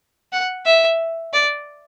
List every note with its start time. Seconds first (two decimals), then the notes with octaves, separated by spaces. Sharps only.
0.32 F#5
0.66 E5
1.33 D5